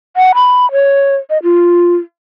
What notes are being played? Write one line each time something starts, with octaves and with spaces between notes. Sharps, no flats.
F#5
B5
C#5
D#5
F4